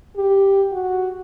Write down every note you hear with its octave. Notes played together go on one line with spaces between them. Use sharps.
G4
F#4